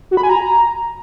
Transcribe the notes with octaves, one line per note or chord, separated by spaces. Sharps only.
F#4
B5
G#5
A#5